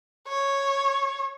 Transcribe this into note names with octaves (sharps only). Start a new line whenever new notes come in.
C#5